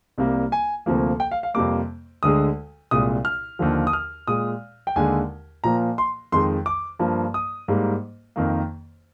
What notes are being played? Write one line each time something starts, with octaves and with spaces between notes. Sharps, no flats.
C2 C3 G3 A#3
G#5
D2 C3 F3 A#3
G5
F5
F5
F2 C3 G3 A#3 D6
D2 D3 G#3 D#6
C2 A#2 G#3 D#6
F6
D#2 D3 F3
D#6
F6
A#2 G#3 D#6
G5
D#2 D3 G#3 G#5
A#2 F3 A#3 A#5
C6
F2 D#3 G#3 C6
D6
G2 F3 A#3
D#6
G#2 G3 A#3
F2 D#3 A#3